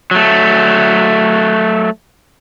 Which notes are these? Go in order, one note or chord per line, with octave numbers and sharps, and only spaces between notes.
F#3 A3